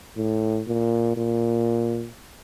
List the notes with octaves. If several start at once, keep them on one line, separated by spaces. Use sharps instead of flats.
A2
A#2
A#2